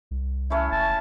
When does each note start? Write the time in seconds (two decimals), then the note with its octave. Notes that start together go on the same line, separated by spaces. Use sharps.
0.11 C2
0.50 A3 C#4 E4
0.71 F#1 A5